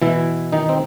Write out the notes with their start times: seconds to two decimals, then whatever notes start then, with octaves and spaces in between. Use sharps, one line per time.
0.02 B2 E3 E4
0.52 D#3 D#4
0.69 C4